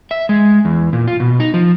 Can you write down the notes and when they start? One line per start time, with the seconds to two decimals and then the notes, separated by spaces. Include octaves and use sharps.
0.11 E5
0.29 G#3
0.65 E2
0.93 A#2
1.07 F4
1.20 B2
1.40 D#4
1.54 F3